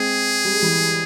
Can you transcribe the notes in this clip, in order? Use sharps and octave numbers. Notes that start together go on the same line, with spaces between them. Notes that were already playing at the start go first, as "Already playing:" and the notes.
Already playing: G#3 C4 G#4
G3
G#3
E3 G3